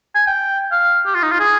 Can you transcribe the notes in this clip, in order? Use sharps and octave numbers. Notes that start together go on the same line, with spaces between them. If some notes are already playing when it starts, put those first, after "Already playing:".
G#5
G5
F5
G4
F4
D#4
F4
G#4